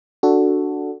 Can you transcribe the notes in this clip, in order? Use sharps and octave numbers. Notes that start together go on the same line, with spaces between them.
D4 F#4 A4